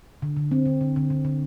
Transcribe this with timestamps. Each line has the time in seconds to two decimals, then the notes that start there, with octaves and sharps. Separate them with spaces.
0.22 D3
0.37 D3
0.51 C4
0.66 D3
0.81 D3
0.96 D3
1.10 D3
1.25 D3